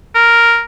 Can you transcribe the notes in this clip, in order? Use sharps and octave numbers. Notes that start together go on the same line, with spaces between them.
A#4